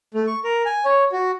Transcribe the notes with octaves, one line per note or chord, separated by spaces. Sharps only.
A3
C#6
A#4
G#5
C#5
F#4